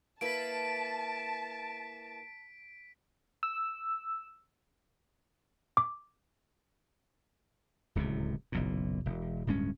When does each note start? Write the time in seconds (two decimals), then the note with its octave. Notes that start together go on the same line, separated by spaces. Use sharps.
0.21 A#3 E4 B4 A5 B6 D7
3.43 E6
5.77 D6
7.95 D1 C#2 A2 C3
8.52 F#1 B1 A#2
9.05 E1
9.47 D1 G2 G#3 C#4